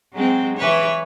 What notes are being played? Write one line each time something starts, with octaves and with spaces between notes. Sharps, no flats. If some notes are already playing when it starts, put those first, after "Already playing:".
F#3 G#3 C4
E3 B4 C#5